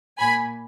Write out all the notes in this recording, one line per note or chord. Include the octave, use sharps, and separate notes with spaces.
A#2 G#5 B5